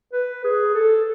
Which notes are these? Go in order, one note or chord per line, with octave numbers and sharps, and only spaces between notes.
B4
G#4
A4